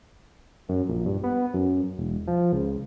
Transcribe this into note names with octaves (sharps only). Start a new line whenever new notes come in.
F#2
A#1
G2
B3
F#2
E1
F3
C#2